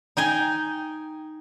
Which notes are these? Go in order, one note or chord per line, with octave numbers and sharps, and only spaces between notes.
D#4 G5 G#5